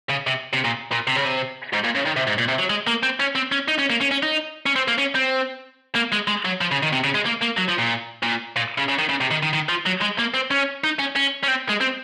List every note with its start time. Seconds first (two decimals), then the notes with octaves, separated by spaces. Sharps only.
0.10 C#3
0.27 C3
0.54 C3
0.65 A#2
0.92 A#2
1.07 C3
1.16 C#3
1.25 C3
1.73 G#2
1.84 A#2
1.95 C#3
2.05 D#3
2.16 C3
2.27 G#2
2.38 A#2
2.48 C3
2.59 F#3
2.70 G#3
2.87 A#3
3.03 C4
3.20 C#4
3.35 C4
3.52 C#4
3.68 D#4
3.79 C#4
3.90 A#3
4.01 C#4
4.11 C#4
4.23 D#4
4.66 C#4
4.76 C4
4.88 A#3
4.98 C#4
5.15 C4
5.95 A#3
6.12 G#3
6.27 G#3
6.45 F#3
6.61 F3
6.71 C#3
6.83 D#3
6.92 C3
7.04 C#3
7.15 G#3
7.26 A#3
7.42 A#3
7.58 F#3
7.69 F3
7.79 A#2
8.23 A#2
8.56 A#2
8.78 C#3
8.89 C#3
8.99 D#3
9.10 C#3
9.21 C3
9.31 D#3
9.43 D#3
9.53 D#3
9.69 F3
9.86 F#3
10.02 G#3
10.19 A#3
10.34 C4
10.51 C#4
10.84 D#4
10.99 C#4
11.16 C#4
11.44 C#4
11.48 C4
11.69 G#3
11.81 C4